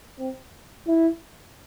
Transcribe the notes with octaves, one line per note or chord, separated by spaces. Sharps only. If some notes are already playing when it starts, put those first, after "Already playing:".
C4
E4